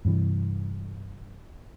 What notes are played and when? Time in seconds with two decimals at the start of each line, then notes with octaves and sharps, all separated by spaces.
0.05 G2 C3 E3